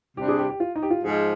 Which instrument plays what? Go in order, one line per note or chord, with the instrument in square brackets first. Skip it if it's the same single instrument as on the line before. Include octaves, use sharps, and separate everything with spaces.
[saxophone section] C3 G3 D4 [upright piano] G4
[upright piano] G#4
G4
G4
F4
D#4
G4
F4
[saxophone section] G#2 F3 G#3 [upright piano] G#4